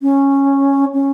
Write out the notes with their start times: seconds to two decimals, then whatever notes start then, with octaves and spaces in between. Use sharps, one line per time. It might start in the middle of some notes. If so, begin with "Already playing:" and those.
0.02 C#4
0.94 C#4